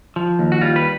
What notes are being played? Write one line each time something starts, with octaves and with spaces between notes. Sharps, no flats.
F3
D#2
F#4
G3 F4
B4